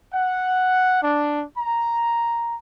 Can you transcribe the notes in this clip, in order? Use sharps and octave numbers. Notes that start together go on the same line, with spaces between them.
F#5
D4
A#5